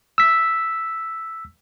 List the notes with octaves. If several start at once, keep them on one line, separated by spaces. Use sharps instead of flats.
E6 B6